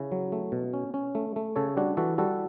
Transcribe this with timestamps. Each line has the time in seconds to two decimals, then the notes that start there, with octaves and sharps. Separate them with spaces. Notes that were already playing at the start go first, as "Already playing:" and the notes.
Already playing: C#3 C#4 E4
0.12 F#3
0.32 A3
0.52 B2
0.73 C#4
0.94 C#4
1.15 A3
1.36 A3
1.56 C#3 A4 C#5
1.77 G3 D4 F#4
1.97 E3 F#4 A4
2.18 G3 F#4 A4